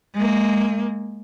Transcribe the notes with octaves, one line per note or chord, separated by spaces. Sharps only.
G#3 A#3